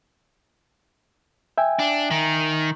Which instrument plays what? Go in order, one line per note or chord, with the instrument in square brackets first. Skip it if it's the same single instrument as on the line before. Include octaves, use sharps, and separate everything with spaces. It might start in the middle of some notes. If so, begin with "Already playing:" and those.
[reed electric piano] E5 G5 G#5
[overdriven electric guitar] D4
D#3